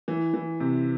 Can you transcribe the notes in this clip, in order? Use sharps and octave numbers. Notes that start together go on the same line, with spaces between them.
E3
E3
C3